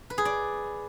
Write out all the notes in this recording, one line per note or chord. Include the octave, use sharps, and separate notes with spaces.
B4
G#4
D5